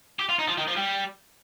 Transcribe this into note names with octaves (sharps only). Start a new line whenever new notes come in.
G4
F4
D#4
F3
D#3
F3
G3